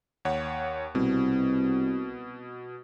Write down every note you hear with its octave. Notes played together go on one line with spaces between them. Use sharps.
D#2 C#5 F#5
C2 B2